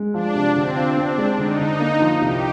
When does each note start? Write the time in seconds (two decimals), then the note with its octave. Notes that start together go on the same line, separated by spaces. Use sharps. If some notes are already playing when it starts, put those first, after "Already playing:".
Already playing: G#3
0.14 F3 D4
0.35 C3
0.55 D3 C4
0.77 F4
0.97 C4 D4
1.18 G#3
1.38 D3 D#4
1.59 D3
1.80 A#3
2.01 F3
2.21 C2 G4